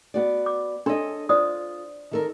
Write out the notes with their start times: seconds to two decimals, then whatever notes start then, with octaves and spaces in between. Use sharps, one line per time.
0.14 B3 F#4 D5
0.46 D6
0.86 D4 A4 C#5 D#5 C6
1.29 F4 C5 D5 D#6
2.11 D#3 A4 A#4